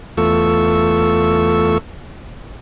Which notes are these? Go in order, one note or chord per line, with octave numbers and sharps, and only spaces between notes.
E2 A3 F4 A4 C#6 E6